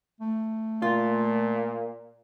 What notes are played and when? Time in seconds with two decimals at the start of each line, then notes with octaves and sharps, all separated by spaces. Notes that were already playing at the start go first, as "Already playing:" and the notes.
0.21 A3
0.82 A#2 F4